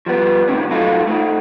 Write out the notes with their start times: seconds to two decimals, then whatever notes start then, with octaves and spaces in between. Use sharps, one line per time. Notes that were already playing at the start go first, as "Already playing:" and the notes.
0.06 F3 G3 B3
0.48 A2 C3 D#3 C#4
0.71 F#3 D#4 F4 F#4 A4
1.07 A3 D#4